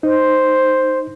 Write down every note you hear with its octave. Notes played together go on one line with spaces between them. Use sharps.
D#4 C5